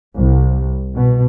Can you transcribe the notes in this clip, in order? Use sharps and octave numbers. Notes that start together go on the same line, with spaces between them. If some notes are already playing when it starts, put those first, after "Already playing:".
C2
B2